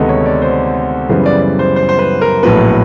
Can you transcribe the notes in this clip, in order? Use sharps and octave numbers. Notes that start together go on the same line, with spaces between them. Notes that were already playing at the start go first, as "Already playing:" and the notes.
Already playing: D2 C3 D#3 G#3 B3 A4 D#5
C#5
D5
C5
F#2 C#3 E3 G3 B3 C5
D5
D5
C5
C5
C5
B4
A#4
A#1 A2 F#3 B3 B4